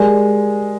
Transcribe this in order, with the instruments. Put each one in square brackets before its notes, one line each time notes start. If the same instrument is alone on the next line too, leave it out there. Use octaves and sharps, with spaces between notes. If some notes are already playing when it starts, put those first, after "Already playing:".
Already playing: [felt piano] G#3 [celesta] G4 A#4 D5 G#5